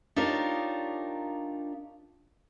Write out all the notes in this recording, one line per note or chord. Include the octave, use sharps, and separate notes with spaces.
D4 D#4 F4 G4 A#4 C#5